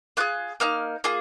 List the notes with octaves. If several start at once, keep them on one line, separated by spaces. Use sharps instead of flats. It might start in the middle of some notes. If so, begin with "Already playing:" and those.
A#3 F4 G#4 F#6
A#3 D#4 F6
A#3 F4 G#4